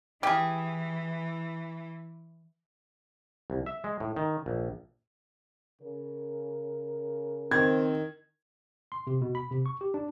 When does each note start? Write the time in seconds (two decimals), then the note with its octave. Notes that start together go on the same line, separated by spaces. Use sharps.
0.23 E3 G4 G#4
3.50 C2
3.66 E5
3.84 G#3
4.00 A2
4.16 D#3
4.46 A#1
5.82 C#3 A#4
7.51 D#3 C4 G#6
8.92 C6
9.07 C3
9.21 B2
9.35 B5
9.51 C3
9.66 C#6
9.81 G4
9.94 D4